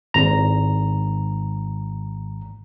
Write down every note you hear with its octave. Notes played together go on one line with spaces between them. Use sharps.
G#1 A#5